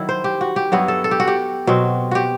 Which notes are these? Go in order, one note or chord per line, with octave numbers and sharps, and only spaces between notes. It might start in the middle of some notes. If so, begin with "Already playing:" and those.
Already playing: D#3 F#3 E4
C5
G4
F#4
G4
G2 F#3 B3 E4 F#4
A4
A4
G4
F#4
G4
B2 F#3 C4
F#4 G4